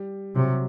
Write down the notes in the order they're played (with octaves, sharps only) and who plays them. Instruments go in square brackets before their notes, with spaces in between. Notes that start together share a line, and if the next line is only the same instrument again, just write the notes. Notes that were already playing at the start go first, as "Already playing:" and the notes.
Already playing: [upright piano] G3
[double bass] C3 [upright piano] F#3